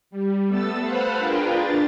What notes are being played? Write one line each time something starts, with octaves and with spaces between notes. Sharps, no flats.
G3
A3 B3 A4 E6 A6
B4 C5 F5 F#5 A5 B5
D4 F4 G#4 A#4 B4 G5
D4 A6